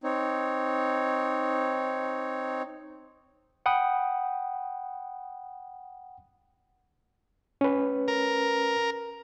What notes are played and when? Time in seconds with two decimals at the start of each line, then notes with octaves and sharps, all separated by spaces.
0.04 C4 D#4 C#5
3.66 F#5 G5 B5 D#6
7.61 C#4 B4
8.08 A#4